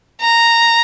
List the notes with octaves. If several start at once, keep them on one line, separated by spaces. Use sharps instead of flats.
A#5